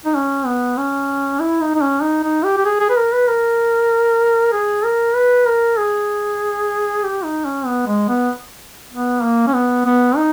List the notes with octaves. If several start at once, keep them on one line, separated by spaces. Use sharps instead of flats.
D#4
C#4
B3
C#4
E4
D#4
D#4
C#4
D#4
D#4
G4
G4
G#4
G#4
B4
A#4
B4
A#4
G#4
A#4
B4
A#4
G#4
G4
D#4
C#4
B3
G#3
B3
B3
A#3
C#4
B3
B3
D#4